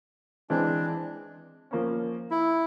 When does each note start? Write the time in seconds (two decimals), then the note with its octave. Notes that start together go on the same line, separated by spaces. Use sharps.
0.50 E3 G#3 C4 D4
1.71 F3 A#3 C#4
2.31 E4